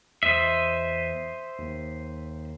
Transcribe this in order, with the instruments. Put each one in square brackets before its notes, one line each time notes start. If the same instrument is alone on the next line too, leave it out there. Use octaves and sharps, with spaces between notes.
[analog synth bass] E2 [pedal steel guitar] C5 D#5 E5
[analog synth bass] D#2